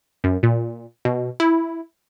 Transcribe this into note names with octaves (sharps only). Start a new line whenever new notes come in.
F#2
A#2
B2
E4